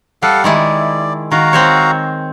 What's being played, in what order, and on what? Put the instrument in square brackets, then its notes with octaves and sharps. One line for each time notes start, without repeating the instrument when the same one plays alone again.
[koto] G3 [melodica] A4 F5 F#5
[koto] D#3 G#3 E4 [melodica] D5
[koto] D#3 [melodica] F#4 F5 A#5
[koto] C4 C5 C#5